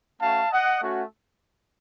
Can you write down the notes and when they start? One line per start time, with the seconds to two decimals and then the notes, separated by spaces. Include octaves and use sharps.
0.22 A3 C#4 F#4 F5 A5
0.52 D#5 F#5
0.82 A3 C#4 F#4